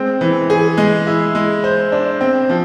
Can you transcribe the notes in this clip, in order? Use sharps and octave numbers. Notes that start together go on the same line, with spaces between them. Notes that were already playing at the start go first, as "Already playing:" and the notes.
Already playing: G#3 C4
E3
G#4
G#3
E4
G#3
C5
D4
C4
F3